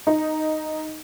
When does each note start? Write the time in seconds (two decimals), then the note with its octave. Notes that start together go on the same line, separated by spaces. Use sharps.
0.07 D#4